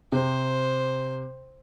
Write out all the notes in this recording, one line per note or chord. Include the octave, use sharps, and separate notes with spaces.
C3 C5